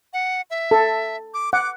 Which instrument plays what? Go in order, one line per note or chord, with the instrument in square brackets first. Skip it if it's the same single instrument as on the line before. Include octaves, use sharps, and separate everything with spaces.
[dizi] F#5
E5
[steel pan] A4
[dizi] D6
[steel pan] F#5 [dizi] D6